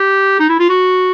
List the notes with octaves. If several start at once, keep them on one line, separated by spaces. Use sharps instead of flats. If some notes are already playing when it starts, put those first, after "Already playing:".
Already playing: G4
D#4
E4
F4
F#4